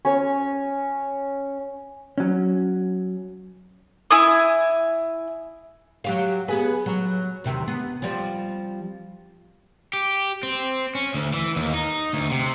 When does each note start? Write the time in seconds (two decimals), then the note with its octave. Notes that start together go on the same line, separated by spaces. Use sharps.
0.05 C#4 C#5
2.18 F#3 C#4
4.11 E4 G#5 D#6
6.04 F#3 G4 F5
6.48 B3 G#4 B4
6.86 F#3
7.44 E2 C3 D#3
7.68 B3
8.02 F3 G3 C4
9.93 G4
10.43 C4
10.95 C#4
11.14 D2
11.33 E3
11.56 D#2
11.73 D#4
12.13 D2
12.31 C3